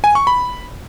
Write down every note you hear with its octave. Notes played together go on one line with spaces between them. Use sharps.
G#5
C#6
B5